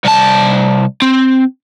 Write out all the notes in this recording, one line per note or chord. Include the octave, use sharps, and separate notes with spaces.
C2 A5
C4